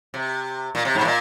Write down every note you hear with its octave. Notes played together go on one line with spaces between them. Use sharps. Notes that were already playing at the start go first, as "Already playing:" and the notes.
C3
A#2
C3
G#2
C3
A#2